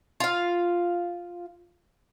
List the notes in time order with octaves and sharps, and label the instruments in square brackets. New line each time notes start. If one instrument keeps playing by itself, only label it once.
[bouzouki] F4 F5